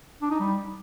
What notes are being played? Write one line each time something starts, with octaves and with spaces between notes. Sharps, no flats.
D4
D#4
G3